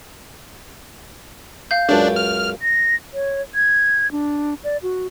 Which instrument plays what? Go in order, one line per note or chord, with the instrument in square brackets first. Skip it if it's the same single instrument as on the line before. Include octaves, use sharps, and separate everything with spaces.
[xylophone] F5 G6
[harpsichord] C#2 F#2 [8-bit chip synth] D4
[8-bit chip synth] F6
[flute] A#6
C#5
G#6
D4
D5
F#4